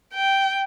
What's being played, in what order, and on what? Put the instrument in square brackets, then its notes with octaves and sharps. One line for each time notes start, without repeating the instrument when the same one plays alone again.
[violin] G5